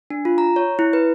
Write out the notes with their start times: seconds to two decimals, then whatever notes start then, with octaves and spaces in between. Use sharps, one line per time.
0.10 D4
0.25 F4
0.38 A#5
0.56 C#5
0.79 E4
0.93 B4